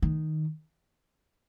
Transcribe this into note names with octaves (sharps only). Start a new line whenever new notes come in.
D#3